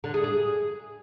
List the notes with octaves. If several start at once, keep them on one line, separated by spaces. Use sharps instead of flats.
D3
G#4
G#4